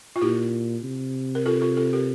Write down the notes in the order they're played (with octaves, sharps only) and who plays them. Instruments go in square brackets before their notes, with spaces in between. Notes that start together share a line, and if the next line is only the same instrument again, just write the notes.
[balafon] F4
[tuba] A#2 [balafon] E4 G4
[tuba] C3
[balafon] A#4
F4 A4
F4 A4
F4 A4
G4 A#4